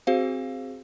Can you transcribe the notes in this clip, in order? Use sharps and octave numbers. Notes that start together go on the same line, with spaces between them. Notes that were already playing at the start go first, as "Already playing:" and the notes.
C4 F#4 G#4 C5 F5